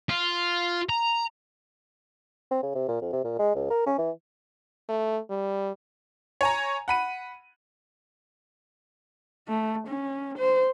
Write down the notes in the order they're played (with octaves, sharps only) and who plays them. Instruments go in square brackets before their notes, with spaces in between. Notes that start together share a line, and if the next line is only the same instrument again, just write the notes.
[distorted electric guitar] F4
A#5
[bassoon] C4
C#3
C3
A#2
F2
C3
A#2
G#3
C#2
A#4
C#4
E3
[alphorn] A3
G3
[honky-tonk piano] C#5 G#5 A#5
F#5 B5 D#7
[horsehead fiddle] A3
C#4
C5